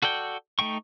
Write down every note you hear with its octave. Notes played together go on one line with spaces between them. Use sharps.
F#4 A4 D5 G5
A3 D#4 G5 C#6